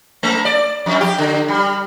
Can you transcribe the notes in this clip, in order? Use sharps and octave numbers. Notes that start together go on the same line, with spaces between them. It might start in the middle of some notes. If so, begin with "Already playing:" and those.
A3
D5
F2
G4
D3
G3